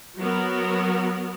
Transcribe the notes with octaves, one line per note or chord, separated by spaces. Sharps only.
F#3 B3 F#4 A#4